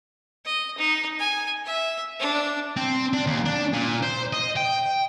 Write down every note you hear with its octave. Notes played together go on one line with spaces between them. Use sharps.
D#5
D#4
G#5
E5
D4
C4
D4
D#2
D4
A#2
C5
D#5
G5